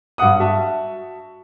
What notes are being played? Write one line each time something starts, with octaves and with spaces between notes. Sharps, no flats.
G2 F#3 F#5 D#6
F#4 E5 A5